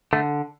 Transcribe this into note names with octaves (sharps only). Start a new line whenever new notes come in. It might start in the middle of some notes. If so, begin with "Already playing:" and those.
D3 A3